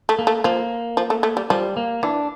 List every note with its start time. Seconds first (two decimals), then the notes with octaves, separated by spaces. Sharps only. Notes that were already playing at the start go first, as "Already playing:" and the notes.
0.09 A3
0.19 A#3
0.27 A3
0.44 F3 A#3
0.97 F3
1.10 A3
1.23 A3
1.37 G3
1.50 F3 G3
1.77 A#3
2.03 E3 D4